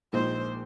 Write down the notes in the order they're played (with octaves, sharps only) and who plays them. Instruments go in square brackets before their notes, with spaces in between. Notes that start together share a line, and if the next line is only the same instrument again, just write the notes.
[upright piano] A#1 A#2 G#3 D#4 [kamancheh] C5